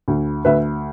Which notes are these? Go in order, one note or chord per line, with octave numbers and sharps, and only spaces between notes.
D2
D2 B4 E5